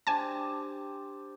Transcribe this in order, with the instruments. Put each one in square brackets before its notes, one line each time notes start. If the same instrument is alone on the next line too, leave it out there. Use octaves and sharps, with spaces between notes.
[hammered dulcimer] D4 G4 C5 [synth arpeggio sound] G#5 A5